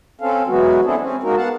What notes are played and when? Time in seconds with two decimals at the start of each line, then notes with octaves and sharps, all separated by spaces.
0.21 C4 C#4 A4 F5
0.48 E3 F#3 G#3 B3 F#4
0.85 B3 C4 D4 E4 G#4 A4
1.00 C4 C#4
1.23 G#3 A#3 D#4 F#4 A#4
1.37 B3 F5 F#5 A5